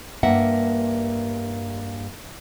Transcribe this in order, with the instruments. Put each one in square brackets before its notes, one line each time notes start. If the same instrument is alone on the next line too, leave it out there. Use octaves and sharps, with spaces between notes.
[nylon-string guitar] G2 A#3 E5 F#5